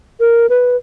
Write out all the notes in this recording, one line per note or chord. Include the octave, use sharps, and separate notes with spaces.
A#4
B4